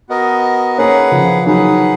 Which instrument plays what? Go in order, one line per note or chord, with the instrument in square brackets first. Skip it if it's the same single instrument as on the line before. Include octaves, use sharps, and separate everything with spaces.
[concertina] B3 F#4 A#4 D#5
[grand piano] A#3 C#4 [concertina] D#4 G#4 B4 F#5
[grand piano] C#3 F3
[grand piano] D#3 F#3 [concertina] D#4 G#4 B4 F#5